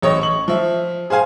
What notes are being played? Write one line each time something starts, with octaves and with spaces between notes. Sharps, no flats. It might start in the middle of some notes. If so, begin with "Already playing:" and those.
A1 C#5 D#5
C#6 F#7
F3 E5
G#4 C5 F5 G#5